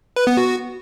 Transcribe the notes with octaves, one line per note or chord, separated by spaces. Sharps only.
B4
B3
F#4